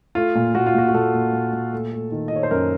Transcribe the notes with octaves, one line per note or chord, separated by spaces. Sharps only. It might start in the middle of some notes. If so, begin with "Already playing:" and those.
A3 F4
A#2
A#2 F#4
F4
A#2 F#4
F#4
A#2 A4
A#2
A#2
A#2
A3
A3
D#3
D#5
D#3 C#5
C5
F#2 A#4